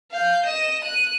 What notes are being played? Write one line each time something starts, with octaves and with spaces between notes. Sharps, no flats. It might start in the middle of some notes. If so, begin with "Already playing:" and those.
F5 G6
D#5 E7
F#6 D#7